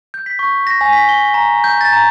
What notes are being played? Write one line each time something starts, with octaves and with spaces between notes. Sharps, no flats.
G6
B6
C#6
A#6
G#5
B6
G7
A#5
G6
A6
A#5